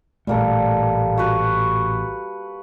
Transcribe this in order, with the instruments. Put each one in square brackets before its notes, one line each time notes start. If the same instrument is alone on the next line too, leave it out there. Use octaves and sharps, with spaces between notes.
[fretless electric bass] A1 A#2 A3 [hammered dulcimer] G3 A#3 A4
[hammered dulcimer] F#4 B4